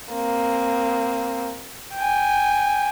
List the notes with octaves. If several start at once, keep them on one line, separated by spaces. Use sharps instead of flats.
A#3 C4
G5 G#5